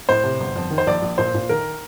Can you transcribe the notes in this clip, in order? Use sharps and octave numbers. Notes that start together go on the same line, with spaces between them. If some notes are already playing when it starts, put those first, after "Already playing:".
A2 C5
C3
G1
F2
D#3
C5
A#1 D5
A#1
A#2 C5
A#2
D#3 A#4